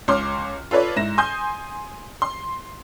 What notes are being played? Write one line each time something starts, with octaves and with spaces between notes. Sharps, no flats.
C#2 C#5 C6 D6 F6
F4 A4 B4 C#5 D5
G#2 E4 A#6 E7
G#5 C6 D#6 G6
C6